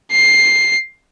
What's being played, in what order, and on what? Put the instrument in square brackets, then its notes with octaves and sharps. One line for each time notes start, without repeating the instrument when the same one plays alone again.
[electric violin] C7